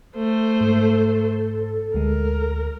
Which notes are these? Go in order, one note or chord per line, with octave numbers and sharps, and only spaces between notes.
A3 C5
G#2 A4
D2 G#3 A#4